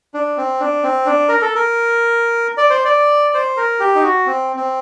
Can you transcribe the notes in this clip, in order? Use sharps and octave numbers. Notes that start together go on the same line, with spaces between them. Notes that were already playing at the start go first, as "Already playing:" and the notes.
D4
C4
D4
C4
D4
A#4
A4
A#4
D5
C5
D5
C5
A#4
G4
D#4
F#4
C4
C4